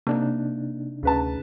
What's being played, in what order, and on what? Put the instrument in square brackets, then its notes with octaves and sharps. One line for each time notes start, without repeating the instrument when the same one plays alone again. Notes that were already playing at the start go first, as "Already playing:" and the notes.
[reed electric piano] C3 D4 D#4 [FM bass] A#3
[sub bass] D2 [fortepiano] C#3 B4 A5